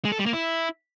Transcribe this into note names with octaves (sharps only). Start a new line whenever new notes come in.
G#3
A4
G3
A#3
E4